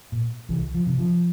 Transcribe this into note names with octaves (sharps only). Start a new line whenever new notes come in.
A#2
C2 E3
F3
C3
F3